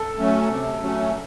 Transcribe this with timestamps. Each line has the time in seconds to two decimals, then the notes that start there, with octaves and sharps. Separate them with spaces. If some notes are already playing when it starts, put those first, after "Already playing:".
Already playing: A4
0.18 F#3 A3 C#4
0.48 C3
0.80 F#3 A3 C#4